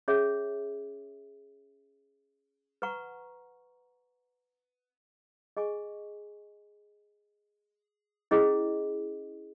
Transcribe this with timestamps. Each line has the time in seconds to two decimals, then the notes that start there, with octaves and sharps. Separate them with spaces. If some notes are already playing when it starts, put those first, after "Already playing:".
0.08 C#4 G#4 C#5 E5
2.82 B4 F#5 A#5 C#6
5.57 G#4 D#5 G#5 C#6
8.31 C#4 E4 G#4 D#5